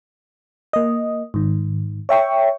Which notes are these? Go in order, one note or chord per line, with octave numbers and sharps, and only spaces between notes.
A#3 D#5
G#2 D#3
C#5 E5 G5 C#6